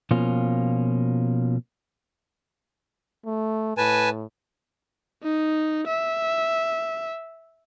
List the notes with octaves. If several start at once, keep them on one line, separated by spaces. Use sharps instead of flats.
B2 F3 A#3 C#4 F4
A3
A2 B4 G#5 A5
D#4
E5